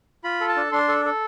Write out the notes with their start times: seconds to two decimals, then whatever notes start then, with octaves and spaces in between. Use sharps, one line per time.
0.24 F4 B5
0.41 A4
0.49 A5
0.57 D4
0.72 D4 C6
0.89 A4
1.05 A4